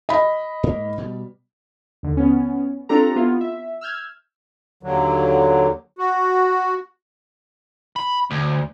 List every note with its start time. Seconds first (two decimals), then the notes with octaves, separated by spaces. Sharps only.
0.09 D#5 B5
0.63 G#2 A#3
0.98 B2 G3
2.03 D#2 D3
2.17 B3 C#4
2.89 C4 D4 F4 G4 A4 A#5
3.16 B3 E4 F4
3.41 E5
3.81 E6 F6 G6 G#6
4.83 D#2 D3 F#3
5.99 F#4
7.96 B5
8.31 D2